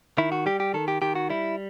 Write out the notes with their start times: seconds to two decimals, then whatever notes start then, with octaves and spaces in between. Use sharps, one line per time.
0.18 D#3 E4
0.32 F#4
0.46 G3 G4
0.60 G4
0.74 D#3 A4
0.88 G4
1.02 D#3 G4
1.15 F#4
1.30 G3 E4